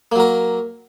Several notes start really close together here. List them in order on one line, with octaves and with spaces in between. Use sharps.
A#3 F#3 A#4